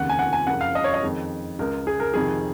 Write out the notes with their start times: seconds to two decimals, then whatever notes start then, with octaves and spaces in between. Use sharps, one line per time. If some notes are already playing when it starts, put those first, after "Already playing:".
Already playing: F1 D#2 C#3 F#5
0.09 G#5
0.19 F#5
0.33 G#5
0.47 F#1 F2 C#3 F#5
0.61 F5
0.75 D#5
0.84 C#5
0.94 D#5
1.03 F2 D#3 G#3
1.59 C#2 C#3 G#3 A#4
1.87 G#4
2.00 A#4
2.14 F2 C3 D#3 G#4